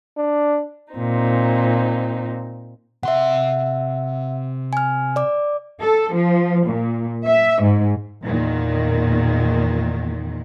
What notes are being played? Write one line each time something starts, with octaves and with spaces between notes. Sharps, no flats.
D4
A#2 C4 D#4
C3 E5 F#5 C6
G#5 F6
D5 D6
A4
F3
A#2
E5
G#2
E2 A#2 D#3